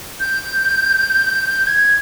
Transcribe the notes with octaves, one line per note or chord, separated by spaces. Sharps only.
G6
G#6